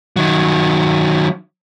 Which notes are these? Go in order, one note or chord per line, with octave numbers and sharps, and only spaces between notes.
D#3 F#3